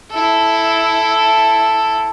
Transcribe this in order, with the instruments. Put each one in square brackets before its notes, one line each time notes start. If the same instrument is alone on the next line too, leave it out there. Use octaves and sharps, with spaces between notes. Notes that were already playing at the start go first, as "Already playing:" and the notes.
[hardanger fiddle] E4 A4